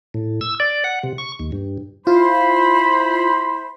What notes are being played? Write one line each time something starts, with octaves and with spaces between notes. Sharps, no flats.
A2
E6
D5
F#5
C3
C#6
D#2
G2
E4 F4 C5 B5